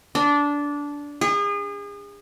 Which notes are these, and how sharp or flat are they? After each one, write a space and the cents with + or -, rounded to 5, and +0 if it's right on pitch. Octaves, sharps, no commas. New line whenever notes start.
D4 -15
G#4 -35